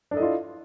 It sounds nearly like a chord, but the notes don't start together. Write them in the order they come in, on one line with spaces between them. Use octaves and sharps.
D4 A4 D#5 E4 F4